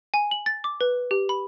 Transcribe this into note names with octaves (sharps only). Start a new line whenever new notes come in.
G#5
F#7
A6
D6
B4
G4
B5